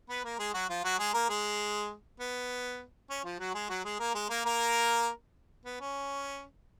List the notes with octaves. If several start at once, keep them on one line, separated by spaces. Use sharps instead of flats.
B3 B4
A#3 A#4
G#3 G#4
F#3 F#4
F3 F4
F#3 F#4
G#3 G#4
A#3 A#4
G#3 G#4
B3
C#4
F3 F4
F#3 F#4
G#3 G#4
F#3 F#4
G#3 G#4
A#3 A#4
G#3 G#4
A#3 A#4
A#3 A#4
B3
C#4